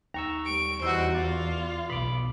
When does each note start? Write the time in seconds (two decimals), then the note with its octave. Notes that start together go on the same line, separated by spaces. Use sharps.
0.14 D#2 A#5 C#6 E6
0.46 G3 C#6 D7
0.82 E2 E3 G3 D#4 F#4 C5 E6
1.15 F4 D5
1.90 B1 B2 B5 D6